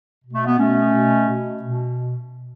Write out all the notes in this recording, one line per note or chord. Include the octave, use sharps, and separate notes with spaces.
B2
A3
B3
B2 A3 C#4
B2
B2
B2